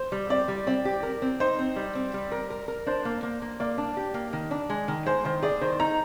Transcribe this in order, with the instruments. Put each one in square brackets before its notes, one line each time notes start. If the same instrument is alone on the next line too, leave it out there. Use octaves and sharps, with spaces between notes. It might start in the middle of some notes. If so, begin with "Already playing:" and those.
Already playing: [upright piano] C5
[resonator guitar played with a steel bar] G3
[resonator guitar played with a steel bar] C4 [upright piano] D5
[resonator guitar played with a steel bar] G3
[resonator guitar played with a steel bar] C4 [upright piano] D5
[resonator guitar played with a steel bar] G4
A#4
C4
[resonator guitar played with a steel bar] D#4 [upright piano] C5
[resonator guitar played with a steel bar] C4
G3
C4
G3
A#4
A#4
A#4
[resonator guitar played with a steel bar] D4 [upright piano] C5
[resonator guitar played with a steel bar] A#3
A#3
A#3
[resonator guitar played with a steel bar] A#3 [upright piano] D5
[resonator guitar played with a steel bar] D4
G4
A#3
D#3
D4
G#3
D#3
[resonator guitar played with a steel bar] G#3 [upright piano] C5
[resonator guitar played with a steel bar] D#3 [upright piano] C5
[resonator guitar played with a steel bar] G#4 [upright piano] D5
[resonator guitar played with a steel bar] D#3 [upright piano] C5
[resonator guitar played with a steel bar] D#4 [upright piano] A#5